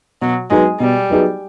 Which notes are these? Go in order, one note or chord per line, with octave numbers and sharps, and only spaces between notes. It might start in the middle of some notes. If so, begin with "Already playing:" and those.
B2 F#3
F#3 G#3 B3 D#4 G#4
B2 G3
F#3 B3 D#4 G#4